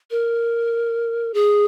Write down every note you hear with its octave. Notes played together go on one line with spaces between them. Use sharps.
A#4
G#4